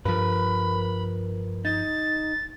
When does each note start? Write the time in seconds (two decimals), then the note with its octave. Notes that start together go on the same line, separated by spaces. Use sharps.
0.05 G2 F3 A#4 B4 B5
1.65 D#4 A6